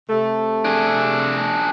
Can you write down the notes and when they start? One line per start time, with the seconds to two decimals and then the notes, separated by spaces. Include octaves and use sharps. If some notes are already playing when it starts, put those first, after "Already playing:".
0.09 C3 A3
0.65 D4 G#4